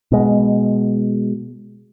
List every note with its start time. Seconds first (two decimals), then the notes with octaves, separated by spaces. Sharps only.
0.12 B2 G#3